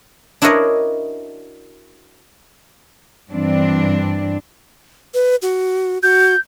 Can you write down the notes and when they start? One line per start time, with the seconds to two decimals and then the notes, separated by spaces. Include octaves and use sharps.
0.42 D4 E4 F#4 A#4 C#5 D#5
3.30 G2 E3 C4 D4
5.14 B4
5.42 F#4
6.02 F#4 G6